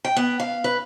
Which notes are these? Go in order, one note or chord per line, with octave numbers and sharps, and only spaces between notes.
G5
B3
F5
B4